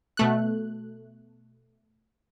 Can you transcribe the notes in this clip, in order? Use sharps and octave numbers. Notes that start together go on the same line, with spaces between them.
B2 A3 F#6